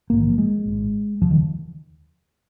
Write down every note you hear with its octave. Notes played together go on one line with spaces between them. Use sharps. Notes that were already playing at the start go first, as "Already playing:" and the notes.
A#1 G#2 A#3
D#3
F3
G#3
G#1 G#2
F1 D#2 C#3 F3
D#3